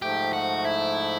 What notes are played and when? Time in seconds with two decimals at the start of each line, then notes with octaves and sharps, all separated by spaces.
0.01 G#2 F3 A3 G4
0.33 F#4
0.65 E4